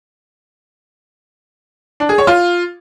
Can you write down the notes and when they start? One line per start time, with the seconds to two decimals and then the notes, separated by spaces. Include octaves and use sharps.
2.00 D4
2.09 G#4
2.18 C#5
2.27 F4